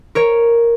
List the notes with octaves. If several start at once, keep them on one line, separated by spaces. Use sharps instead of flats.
A#4 C#5